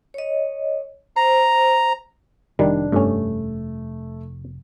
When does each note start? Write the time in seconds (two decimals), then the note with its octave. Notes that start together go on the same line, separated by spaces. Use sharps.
0.14 C#5 D#5
1.16 C5 A#5
2.59 F1 D#3 G3 D4
2.92 G2 A3 C#4